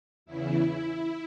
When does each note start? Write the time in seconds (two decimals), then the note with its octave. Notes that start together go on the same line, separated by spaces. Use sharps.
0.26 E2 C#3 E3 E4